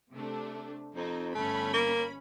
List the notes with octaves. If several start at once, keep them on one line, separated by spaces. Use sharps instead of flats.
C3 A3 D4
F2 C4 D#4
G1 A3 C#4 B5
A#3